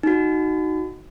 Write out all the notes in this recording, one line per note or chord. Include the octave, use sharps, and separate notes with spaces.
D#4 F#4